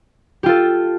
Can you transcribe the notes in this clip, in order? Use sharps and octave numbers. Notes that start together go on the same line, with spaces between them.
F4 G4 A4